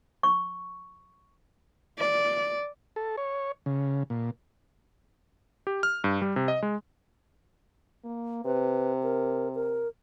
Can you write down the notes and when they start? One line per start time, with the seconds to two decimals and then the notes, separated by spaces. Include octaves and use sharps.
0.23 C#6
1.98 D5
2.96 A4
3.17 C#5
3.66 C#3
4.10 A#2
5.67 G4
5.83 F6
6.04 G2
6.22 G3
6.36 C3
6.48 D#5
6.63 G#3
8.04 A#3
8.45 C3 B4
9.03 A#4
9.55 A#4